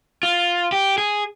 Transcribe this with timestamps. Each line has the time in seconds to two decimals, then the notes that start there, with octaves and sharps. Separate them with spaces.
0.23 F4
0.72 G4
0.98 G#4